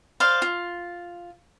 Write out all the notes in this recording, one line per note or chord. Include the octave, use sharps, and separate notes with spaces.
C5 D5 F5
F4